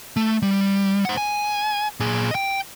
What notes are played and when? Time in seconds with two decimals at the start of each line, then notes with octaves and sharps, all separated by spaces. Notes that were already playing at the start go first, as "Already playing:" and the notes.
0.16 A3
0.42 G3
1.05 C5 F#5
1.17 G#5
2.00 A#2 G#4
2.31 D#5 G5